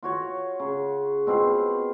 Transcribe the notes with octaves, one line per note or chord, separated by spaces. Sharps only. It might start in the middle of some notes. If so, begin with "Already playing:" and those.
F4 F#4 C#5
C#3
B2 C4 F4 G#4